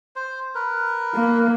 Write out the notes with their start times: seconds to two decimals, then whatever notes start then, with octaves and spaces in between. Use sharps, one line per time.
0.16 C5
0.55 A#4 B4
1.15 A#3